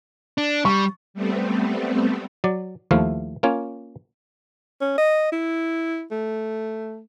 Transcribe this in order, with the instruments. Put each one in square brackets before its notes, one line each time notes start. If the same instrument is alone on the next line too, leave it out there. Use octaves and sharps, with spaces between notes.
[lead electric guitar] D4
[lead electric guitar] G3 [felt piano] C#6
[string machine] G3 A3 B3 C4
[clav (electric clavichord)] F#3 D5
D#2 F3 A3 E4 F5
A#3 C#4 F4 C#5
[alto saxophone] C#4
D#5
E4
A3